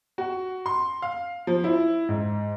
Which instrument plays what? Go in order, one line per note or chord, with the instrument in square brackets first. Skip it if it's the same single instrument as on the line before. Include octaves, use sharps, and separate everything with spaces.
[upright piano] F#4
C6
F5
F3
E4
G#2